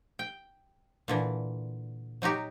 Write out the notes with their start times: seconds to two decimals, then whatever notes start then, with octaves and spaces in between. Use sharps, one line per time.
0.19 G5
1.08 A#2 D3 E3
2.22 F#3 D#4 F#4 G4